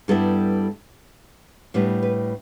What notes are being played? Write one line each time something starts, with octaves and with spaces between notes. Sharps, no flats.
G2 G3 B3 E4 A4
A2 G3 B3 D4 B4
B4